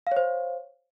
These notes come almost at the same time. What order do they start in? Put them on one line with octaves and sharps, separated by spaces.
F5 C#5 C5